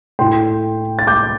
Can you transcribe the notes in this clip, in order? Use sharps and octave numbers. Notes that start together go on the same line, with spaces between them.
A2 A3 G5 C6
A6
D6 G6